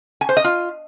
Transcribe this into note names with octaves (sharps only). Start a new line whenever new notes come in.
G#5
C5
D#5
F4